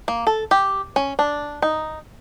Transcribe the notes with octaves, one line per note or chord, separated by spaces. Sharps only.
A#3
A4
G4
C#4
D4
D#4